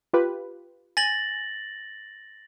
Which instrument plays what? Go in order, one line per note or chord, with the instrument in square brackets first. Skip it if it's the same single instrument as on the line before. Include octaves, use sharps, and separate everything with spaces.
[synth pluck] F4 G4 B4
[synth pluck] G#5 [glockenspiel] A6 A#6 F#7